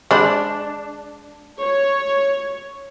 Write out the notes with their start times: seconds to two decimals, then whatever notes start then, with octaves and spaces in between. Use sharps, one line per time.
0.11 G#3 D4 C5 B5
1.60 C#5